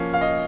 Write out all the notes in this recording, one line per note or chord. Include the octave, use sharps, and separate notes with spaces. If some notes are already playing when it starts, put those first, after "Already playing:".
Already playing: F3 A#3 C#4 F5
F5
D#5